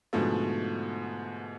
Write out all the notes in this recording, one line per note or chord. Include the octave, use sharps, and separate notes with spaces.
G#2 B2 D3 F3 A3